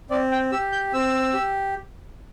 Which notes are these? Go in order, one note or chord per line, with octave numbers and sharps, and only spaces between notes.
C4 D5
G5
G4 E6
G6
C4 E6
G4